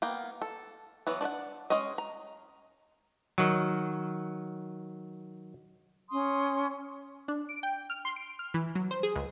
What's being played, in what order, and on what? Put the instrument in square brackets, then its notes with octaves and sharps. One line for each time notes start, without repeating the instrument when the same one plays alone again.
[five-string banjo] A#3 B3 G5
A4
E3 F#3 B3
D4 D5 D#5 F#5
G#3 C#4 G#4 D#5
A#5
[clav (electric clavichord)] D#3 F#3
[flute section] C#4 C6 D#6
[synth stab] D4
D7
G5
F6
C6
D7
F6
E3
F#3
C5
G#4
C#2